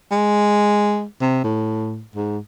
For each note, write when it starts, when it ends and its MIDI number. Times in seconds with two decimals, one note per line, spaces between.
0.11 1.04 56
1.22 1.44 48
1.44 2.03 45
2.16 2.38 44